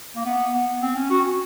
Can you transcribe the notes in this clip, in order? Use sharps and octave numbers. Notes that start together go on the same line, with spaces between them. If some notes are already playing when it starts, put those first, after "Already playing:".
A#3
B3
B3
C4
C#4
F#4